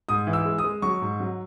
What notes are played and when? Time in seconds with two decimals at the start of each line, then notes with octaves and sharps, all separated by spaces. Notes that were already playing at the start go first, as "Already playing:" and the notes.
0.09 G#2 D#6
0.27 E3
0.33 E6
0.45 G#3
0.58 D#6
0.64 G#3
0.82 F#3 C#6
1.02 G#2
1.20 F#3